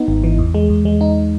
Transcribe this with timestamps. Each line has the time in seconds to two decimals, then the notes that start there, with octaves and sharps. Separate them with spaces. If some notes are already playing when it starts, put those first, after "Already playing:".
Already playing: B3 D#4
0.08 G#1
0.24 E3
0.38 E2
0.55 G#3
0.69 E2
0.85 G#3
1.01 D#4